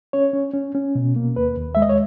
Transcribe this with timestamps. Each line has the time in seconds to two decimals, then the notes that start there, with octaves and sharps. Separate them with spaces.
0.13 C#4 C#5
0.33 C#4
0.54 C#4
0.75 C#4
0.95 B2
1.16 A#3
1.36 D#2 B4
1.57 D#2
1.75 G#3 E5
1.82 D#5
1.89 C#5